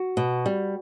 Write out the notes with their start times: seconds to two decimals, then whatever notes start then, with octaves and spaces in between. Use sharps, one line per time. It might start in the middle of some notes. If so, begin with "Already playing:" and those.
Already playing: F#4
0.17 B2
0.46 G3